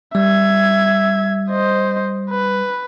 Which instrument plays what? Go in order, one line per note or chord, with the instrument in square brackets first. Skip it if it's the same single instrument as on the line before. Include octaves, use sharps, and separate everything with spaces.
[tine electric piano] G3 [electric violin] E5 G#6
[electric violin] C5 D#5
B4